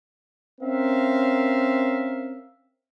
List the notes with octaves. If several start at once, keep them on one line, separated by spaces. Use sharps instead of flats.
C4 C#4 A#4 E5 F5